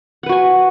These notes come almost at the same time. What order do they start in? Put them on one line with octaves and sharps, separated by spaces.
F#5 B4 F#4 G#5